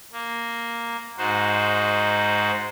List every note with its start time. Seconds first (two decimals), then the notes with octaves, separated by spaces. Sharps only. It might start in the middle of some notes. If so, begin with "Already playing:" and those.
0.12 A#3
1.18 G#2 D#4 F#4 C5